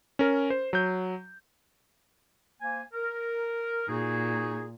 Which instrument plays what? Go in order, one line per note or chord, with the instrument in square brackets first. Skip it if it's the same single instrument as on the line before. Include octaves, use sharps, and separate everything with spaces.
[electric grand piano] C#4 A#4
C5
F#3 G6
[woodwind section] A#3 C5 G#5
A#4
[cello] A#2 [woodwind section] D#4 F#4 G#4